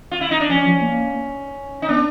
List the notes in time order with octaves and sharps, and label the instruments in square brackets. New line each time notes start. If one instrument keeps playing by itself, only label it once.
[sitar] F4
E4
D#4
D4
[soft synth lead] F3 [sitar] C#4
[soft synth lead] F3
A#3
[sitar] D#4
[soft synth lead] B3 [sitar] D4